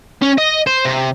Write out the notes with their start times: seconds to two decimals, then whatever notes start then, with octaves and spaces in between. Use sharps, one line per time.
0.22 C#4
0.38 D#5
0.67 C5
0.85 C3